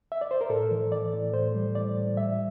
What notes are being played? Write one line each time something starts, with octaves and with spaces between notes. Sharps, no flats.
E5
D5
C5
A#4
A2 A4
E3
E3 D5
A2
A2 C5
G3
A2 D5
A2
G3 E5